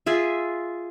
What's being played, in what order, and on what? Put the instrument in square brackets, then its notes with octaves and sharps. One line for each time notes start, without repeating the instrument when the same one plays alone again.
[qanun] F4 G#4 E5